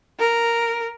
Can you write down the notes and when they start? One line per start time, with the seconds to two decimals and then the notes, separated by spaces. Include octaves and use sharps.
0.19 A#4